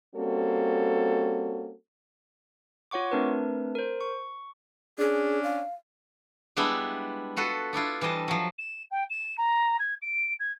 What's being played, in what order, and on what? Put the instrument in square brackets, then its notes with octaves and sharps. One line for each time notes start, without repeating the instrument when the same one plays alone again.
[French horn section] G3 A#3 C4 C#4 F#4 A4
[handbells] F4 C#5 F#5 C#6 D6
A3 C4 D4 A#4 B4
A#4 C5
C#6
[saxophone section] C#4 D4 [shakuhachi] G#4
[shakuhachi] F5
[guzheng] G3 G#3 B3 D4 E4
F4 F#4 A4 B4
B3 D4 E4 F4
E3 G3 C5 D#5 A5
F3 F#3
[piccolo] E7
G5
E7
A#5
G#6
D7
G#6